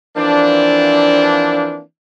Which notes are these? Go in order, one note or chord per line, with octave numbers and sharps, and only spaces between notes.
E3 F3 A#3 C4 D4